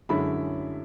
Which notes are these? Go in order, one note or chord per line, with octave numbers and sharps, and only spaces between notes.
F#2 D3 G#3 C#4 E4 B5